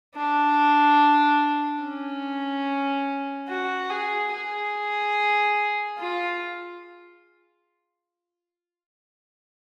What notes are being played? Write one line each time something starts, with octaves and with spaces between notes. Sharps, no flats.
D4
C#4
F#4
G#4
G#4
F4